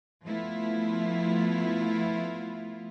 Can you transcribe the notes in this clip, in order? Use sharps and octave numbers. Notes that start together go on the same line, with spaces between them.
F3 A3 B3 E4 F4